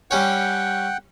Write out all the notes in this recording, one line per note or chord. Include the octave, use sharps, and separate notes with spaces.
G3 C#4 C#5 F#5 G5